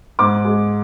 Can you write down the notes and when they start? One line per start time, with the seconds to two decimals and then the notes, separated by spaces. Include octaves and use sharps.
0.19 G#2 D6
0.45 G#3